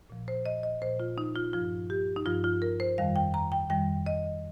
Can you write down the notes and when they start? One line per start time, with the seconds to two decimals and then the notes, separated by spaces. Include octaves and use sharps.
0.10 A#2 F3
0.28 C5
0.46 D#5
0.63 D#5
0.82 A#2 F3 C5
1.00 F4
1.18 D#4
1.36 F4
1.53 G2 F3 F4
1.90 G4
2.16 D#4
2.26 G2 F3 F4
2.44 F4
2.62 A#4
2.80 C5
2.98 F2 D#3 G3 F5
3.16 G5
3.34 A#5
3.52 G5
3.70 F2 D#3 G3 G5
4.06 D#5